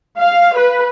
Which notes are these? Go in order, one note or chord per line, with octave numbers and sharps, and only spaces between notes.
F5
B4